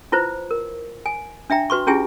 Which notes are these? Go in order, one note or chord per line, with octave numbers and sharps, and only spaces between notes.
E4 F4 B4 C5
A#4
G#5
D4 E5 G5 A#5
F#4 B4 C6 C#6
C#4 E4 F4 G4 G#4 G#5